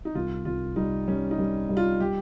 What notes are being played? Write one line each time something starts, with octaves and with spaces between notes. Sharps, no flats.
D#4
C2 F4
C2 F4
G3 D#4
G3 C#4
D#4
G3
G3
F4
G3 G4